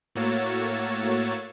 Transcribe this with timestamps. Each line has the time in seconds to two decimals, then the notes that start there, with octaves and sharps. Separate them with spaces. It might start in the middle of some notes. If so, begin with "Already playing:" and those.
0.15 A2 A#3 F#4 C#5 E6 A6